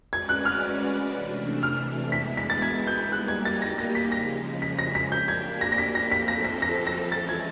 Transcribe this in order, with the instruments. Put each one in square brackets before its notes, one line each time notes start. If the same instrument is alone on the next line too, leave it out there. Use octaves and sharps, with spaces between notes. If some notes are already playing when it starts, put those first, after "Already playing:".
[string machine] G#3 C#4 F#4 B4 D5 [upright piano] G#6
[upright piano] F#6
F6
[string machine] C3 E3 A3 D4
[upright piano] F6
[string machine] G#3 B3 E4 [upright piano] B6
[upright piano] B6
A6
G#6
G6
[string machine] G3 A#3 D#4 G4 [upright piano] F#6
[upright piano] G#6
A6
A#6
A#6
B6
[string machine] C#3 F3 G#3 [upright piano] A#6
[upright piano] B6
A#6
B6
[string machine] A#3 D4 G4 [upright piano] G6
[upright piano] G#6
A#6
A#6
B6
A#6
[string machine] F3 A3 C4 F4 A4 [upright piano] B6
[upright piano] A#6
B6
A#6
A#6
[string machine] E3 G#3 C#4 E4 [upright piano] A6
[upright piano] G#6